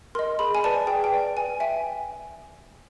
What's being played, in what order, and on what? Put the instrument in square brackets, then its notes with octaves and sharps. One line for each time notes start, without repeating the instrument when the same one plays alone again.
[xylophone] A#4 D#5 C6
G#4 B5
G#5
B4 D5 A5
G#4 G5
G5
B4 D5
B4 G#5
E5 G5 G#5